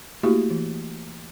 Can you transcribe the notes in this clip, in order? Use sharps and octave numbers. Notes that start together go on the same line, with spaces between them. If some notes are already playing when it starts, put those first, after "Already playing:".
A3 A#3 E4 F#4 G4
E3